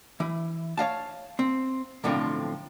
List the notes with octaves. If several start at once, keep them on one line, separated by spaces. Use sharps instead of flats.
E3 E4
C#5 D#5 F5 A5
C4
B1 A2 D3 F3 C4 F5